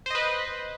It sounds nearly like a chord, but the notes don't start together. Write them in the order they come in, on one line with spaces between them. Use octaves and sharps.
C5 D#5 B4